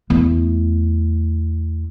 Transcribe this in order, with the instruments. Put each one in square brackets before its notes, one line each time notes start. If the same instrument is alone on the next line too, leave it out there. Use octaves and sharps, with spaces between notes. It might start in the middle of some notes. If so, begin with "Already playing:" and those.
[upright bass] E2 A3